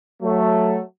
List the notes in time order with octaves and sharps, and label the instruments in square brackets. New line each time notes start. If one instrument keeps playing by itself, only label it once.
[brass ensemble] F#3 A3